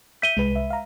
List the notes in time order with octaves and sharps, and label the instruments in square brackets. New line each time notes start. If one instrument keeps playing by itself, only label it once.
[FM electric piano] E5 G6 [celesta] B6 D#7 G7
[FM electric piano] C2 B4 [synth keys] G#3
[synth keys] E5
[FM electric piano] F5 A#5